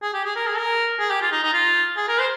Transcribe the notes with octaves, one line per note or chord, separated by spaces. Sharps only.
G#4
G4
G#4
A#4
G#4
A#4
G#4
G4
F4
D#4
D#4
F4
G#4
A#4
C5